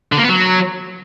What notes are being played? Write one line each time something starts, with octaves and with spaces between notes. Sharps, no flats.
D3
A#3
B3
F#3